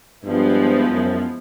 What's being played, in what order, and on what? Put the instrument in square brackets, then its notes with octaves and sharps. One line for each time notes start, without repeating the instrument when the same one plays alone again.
[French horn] G2 [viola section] F3 G#3 B3 E4
[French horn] F#2